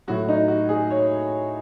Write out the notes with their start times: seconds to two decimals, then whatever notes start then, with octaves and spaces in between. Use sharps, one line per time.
0.08 A2 F#3 F#4
0.29 D#4
0.48 F#4
0.69 G#4
0.90 C#5